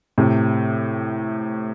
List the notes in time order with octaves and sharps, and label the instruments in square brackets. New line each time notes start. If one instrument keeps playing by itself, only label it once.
[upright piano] A2 C3